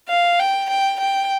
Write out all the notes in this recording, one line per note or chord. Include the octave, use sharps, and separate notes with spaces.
F5
G5
G5
G5